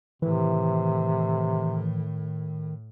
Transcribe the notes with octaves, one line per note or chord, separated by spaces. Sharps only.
A2 C3 D#3 E3